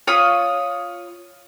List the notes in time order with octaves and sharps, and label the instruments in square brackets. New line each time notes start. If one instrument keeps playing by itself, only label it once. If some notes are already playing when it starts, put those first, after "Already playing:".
[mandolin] F4 C#5 B5 D#6